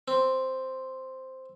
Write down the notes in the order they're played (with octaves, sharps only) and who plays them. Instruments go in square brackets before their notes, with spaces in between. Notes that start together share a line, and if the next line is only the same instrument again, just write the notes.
[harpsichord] C4